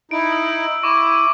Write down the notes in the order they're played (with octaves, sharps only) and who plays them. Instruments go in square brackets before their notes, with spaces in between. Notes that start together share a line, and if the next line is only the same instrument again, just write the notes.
[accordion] D#4 E4 [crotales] D7
[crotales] E6
[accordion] E4 [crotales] C#6 D6